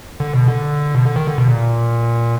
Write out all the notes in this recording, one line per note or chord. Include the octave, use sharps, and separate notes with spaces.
D3
B2
D3
B2
D3
D#3
D3
B2
A#2